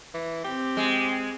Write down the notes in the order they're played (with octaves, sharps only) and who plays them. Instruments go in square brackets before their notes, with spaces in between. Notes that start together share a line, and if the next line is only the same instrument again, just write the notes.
[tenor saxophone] E3
[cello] C4 [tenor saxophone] G4
[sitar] G#3